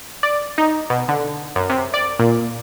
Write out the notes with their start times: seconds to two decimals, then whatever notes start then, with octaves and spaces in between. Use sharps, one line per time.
0.23 D5
0.58 D#4
0.90 B2
1.08 D3
1.56 F#2
1.69 C3
1.94 D5
2.19 A#2